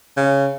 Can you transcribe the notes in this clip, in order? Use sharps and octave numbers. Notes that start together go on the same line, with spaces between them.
C#3